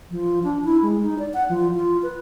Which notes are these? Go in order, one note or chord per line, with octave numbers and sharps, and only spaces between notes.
F3
D4
E4
G#3
D#4
D5
F#5
F3
F4
B4